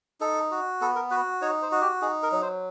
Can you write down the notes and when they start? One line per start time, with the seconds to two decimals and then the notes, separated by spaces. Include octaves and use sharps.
0.21 D#4 A4
0.51 F#4
0.81 B3 A4
0.96 A#4
1.11 F#4 B4
1.41 D#4 C#5
1.62 C5
1.72 F#4
1.82 G4
2.02 D#4 G#4
2.23 A#4
2.32 F#3
2.42 C5